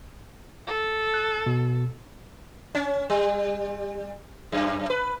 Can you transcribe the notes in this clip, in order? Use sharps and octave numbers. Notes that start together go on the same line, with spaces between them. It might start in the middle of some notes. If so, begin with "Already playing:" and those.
A4
F#6
B2
C#4
G3
F#2
B4